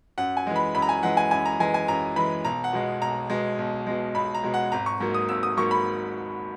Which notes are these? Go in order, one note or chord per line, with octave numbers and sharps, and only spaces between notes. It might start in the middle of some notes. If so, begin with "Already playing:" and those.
F#2 F#5
G#5
E3 G#3
B5
F#2 B5
A#5
G#5
E3 G#3 F#5
G#5
F#2 G#5
A#5
E3 G#3 G#5
G#5
F#2 A#5
E3 G#3 B5
B1 A#5
F#5
B2 G#3
B1 A#5
B2 G#3
B1
B2 G#3
B1 B5
A#5
B2 G#3
F#5
G#1 A#5
C#6
G#2 F#3 A#3
D#6
G#1 E6
D#6
G#2 F#3 A#3 C#6
B5